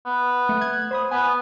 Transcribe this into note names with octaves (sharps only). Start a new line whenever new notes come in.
B3
A3
F#6 G#6
C5 B5 D#6
B3 G#5